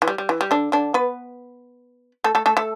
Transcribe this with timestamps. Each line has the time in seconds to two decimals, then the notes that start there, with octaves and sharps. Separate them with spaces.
0.02 E3
0.08 G3
0.18 G3
0.29 E3
0.41 G3
0.51 D3 D4
0.72 D3 D4
0.94 B3 B4
2.24 A3 A4
2.35 A3 A4
2.46 A3 A4
2.57 A3 A4